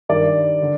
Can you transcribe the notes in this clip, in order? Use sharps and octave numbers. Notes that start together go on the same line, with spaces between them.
G2 D#3 G3 A#4 D5
D3